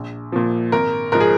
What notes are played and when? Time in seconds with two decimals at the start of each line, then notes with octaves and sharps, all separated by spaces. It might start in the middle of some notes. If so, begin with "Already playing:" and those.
Already playing: A#1
0.32 A#2 F3
0.72 G#1 A#4
1.12 G#2 F3 A#4
1.21 G#4